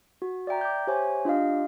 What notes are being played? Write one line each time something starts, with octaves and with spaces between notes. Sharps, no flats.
F#4
D5 E5 G5 A#5
D6 G6
G4 C5 C#5 E5 G#5 C#6
D4 F4 G4 D#5 F5